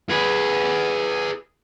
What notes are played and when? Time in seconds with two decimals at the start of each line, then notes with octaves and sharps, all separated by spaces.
0.09 G#4 B4